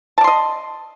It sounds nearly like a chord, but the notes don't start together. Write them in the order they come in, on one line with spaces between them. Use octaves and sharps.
A5 D5 C6 D#5